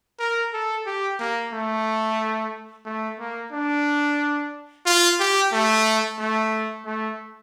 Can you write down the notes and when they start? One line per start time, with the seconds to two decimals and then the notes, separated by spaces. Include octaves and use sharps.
0.20 A#4
0.53 A4
0.86 G4
1.19 A#3
1.53 A3
2.86 A3
3.20 A#3
3.53 D4
4.86 F4
5.20 G4
5.52 A3
6.19 A3
6.86 A3